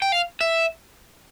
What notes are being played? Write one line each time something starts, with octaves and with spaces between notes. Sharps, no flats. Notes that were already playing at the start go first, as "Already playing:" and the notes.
G5
F5
E5